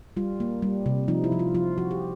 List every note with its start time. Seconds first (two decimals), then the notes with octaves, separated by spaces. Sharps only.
0.17 G3 F4
0.40 A#3
0.62 G3
0.86 C3
1.08 F3 D#4
1.24 E4
1.32 F3
1.39 F4
1.55 F3 F4
1.78 F3 F#4
1.91 G4